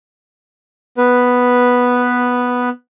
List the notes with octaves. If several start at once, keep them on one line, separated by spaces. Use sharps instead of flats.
B3 B4